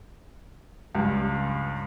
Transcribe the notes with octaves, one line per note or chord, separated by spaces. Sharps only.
C#2 G2